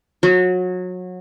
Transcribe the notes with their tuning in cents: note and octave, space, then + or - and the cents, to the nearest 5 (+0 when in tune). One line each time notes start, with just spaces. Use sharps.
F#3 -25